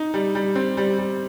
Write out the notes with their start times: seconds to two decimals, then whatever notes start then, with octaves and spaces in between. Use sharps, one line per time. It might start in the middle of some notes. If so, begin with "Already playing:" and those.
Already playing: D#4
0.14 G3
0.35 G3
0.55 C4
0.77 G3
0.98 G3